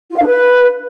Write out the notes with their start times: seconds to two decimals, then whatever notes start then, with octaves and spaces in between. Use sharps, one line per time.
0.10 F4
0.15 F5
0.20 D4
0.26 B4